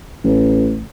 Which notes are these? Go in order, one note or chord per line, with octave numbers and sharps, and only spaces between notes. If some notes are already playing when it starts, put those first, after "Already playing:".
A1